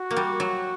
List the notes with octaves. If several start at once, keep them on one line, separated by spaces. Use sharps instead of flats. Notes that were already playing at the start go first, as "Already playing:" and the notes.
Already playing: F#4
A#3
G3
F#3